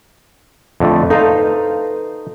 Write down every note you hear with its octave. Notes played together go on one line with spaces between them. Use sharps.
F2 D3 A3
D#4 A4 B4 C5 F5